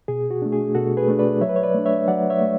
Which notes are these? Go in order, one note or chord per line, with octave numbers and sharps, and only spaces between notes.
B2 G#4
F#4
A3 D4
G#4
B2 F#4 A4
G#4 B4
A3 D4
B4 D5
F#3 C#5 E5
B4
C#5
B4 D5
A3 D4
C#5 E5
F#3 D5 F#5
C#5 E5
A3